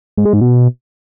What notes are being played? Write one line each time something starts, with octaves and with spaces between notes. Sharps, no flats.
G#2
G#3
G#2
B2